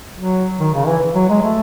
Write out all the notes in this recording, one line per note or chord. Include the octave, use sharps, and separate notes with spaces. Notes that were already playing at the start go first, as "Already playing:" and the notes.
F#3
D#3
C#3
E3
F#3
G#3
A3